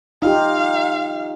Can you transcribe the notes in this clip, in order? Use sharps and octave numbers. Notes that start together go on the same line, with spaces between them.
D#4 F4 G4 F5